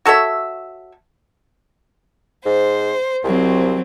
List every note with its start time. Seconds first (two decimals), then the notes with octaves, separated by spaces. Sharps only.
0.05 F#4 A4 C#5 E5
2.45 G#2 C5
3.24 C2 F#3 C4